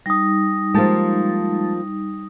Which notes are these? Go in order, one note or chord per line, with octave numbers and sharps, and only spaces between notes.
G3 D#4 D#6 A#6
F3 G#3 A#3 G4 A5 A6